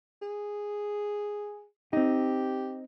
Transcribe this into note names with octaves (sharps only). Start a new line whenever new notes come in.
G#4
C4 D#4 G4